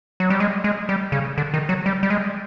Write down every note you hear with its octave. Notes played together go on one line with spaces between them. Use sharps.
F#3
G3
G#3
G#3
G3
C#3
D3
D#3
F#3
G3
G3
G#3